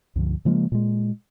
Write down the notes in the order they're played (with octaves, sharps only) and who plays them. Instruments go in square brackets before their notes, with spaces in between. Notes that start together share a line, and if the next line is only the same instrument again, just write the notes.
[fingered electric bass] C#2 G2 D3 F3
C#3 F3 G#3 A#3
A#2 G#3